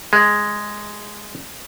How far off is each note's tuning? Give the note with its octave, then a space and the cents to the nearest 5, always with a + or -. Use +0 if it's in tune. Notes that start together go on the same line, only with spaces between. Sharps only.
G#3 +0